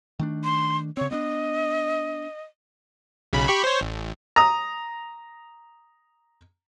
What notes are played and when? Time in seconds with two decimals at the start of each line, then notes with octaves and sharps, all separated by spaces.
0.19 D#3 A3 D4
0.44 C6
0.97 C#3 C4 C#5
1.11 B3 C4 D4 D#5
3.33 B1 C#3 B5
3.48 G4 B5 C#6
3.64 C5 C#5
3.81 A1
4.36 A#5 D#6